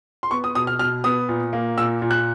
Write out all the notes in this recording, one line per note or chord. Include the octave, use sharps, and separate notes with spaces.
C6
B3 C#6
D#6
B2 D#6
F6
B2 F6
B3 D#6
A#2
A#3
A#2 E6
A#2
F#6